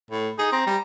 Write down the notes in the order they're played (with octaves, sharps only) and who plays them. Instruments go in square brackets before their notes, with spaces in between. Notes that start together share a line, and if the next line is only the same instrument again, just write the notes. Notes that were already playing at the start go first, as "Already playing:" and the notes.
[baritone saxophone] A2
[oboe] D#4 [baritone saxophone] G#4
[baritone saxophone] C4 [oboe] A#5
[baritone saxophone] G3